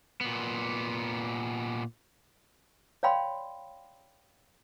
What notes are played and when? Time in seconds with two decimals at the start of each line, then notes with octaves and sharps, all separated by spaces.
0.21 A#2 B3
3.03 C#5 D5 F5 G5 B5 C6